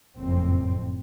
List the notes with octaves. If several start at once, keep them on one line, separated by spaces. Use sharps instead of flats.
F#1 F2 A2 C4